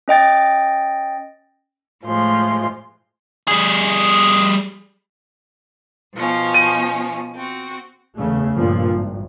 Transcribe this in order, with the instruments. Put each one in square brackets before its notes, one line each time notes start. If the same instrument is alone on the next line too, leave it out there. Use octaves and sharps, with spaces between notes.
[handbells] C#4 D#5 G5 A6
[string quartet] A2 F3 G#3 C6
[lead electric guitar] G3 G#4
[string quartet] B2 F3 C#4
[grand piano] D#7
[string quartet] C4 F#4
[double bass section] E2 C#3 A3
G1 G2 A#2 F3
G#1